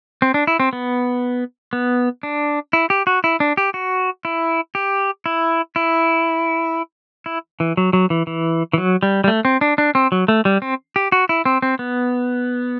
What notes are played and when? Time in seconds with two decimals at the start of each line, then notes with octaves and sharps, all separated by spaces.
0.22 C4
0.34 D4
0.47 E4
0.60 C4
0.73 B3
1.73 B3
2.23 D4
2.73 E4
2.90 G4
3.07 F#4
3.24 E4
3.40 D4
3.57 G4
3.74 F#4
4.25 E4
4.75 G4
5.26 E4
5.76 E4
7.26 E4
7.60 E3
7.77 F#3
7.93 F#3
8.10 E3
8.27 E3
8.73 E3
8.78 F#3
9.03 G3
9.24 G3
9.28 A3
9.45 C4
9.61 D4
9.78 D4
9.95 C4
10.12 F#3
10.28 A3
10.45 G3
10.62 C4
10.96 G4
11.12 F#4
11.29 E4
11.46 C4
11.62 C4
11.79 B3